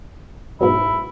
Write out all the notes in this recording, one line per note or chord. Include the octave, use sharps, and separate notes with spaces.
G#2 B2 F#3 E4